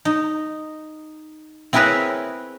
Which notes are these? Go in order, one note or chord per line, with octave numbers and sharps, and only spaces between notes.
D#4
C4 E4 G#4 A#4 B4 C#5